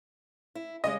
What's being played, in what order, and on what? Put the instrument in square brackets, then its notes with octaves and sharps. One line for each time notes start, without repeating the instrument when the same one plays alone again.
[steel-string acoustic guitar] E4
[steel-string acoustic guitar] C#3 G3 G#3 [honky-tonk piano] D#5